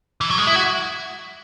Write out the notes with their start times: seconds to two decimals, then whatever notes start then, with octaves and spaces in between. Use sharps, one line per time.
0.21 E3
0.30 F#3
0.38 G#3
0.47 E4
0.56 F#4